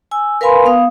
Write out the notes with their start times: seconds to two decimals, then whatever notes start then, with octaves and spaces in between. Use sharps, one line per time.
0.11 G#5 E6
0.41 A#4 B4 F5 G#5 B5 C6
0.65 B3 F5 D#6